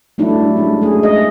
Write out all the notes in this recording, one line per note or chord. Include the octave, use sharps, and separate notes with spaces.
F#3 G3 A3 D4 E4
G#3 C#4
A3 G#4
D#5